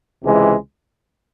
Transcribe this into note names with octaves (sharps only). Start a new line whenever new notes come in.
C#2 C3 E3 G#3